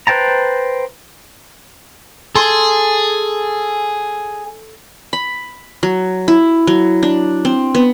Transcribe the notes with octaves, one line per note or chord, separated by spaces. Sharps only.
B4 C5 G5 A5 A#5
G#4 A4 C6
B5
F#3
E4
F#3
D4
C4
B3